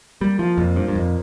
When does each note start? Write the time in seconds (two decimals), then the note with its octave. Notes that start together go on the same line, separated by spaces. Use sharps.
0.20 G3 A#3
0.39 F3 F4
0.57 F2 A#2
0.76 G2 F3
0.88 G2
0.95 F2 A#3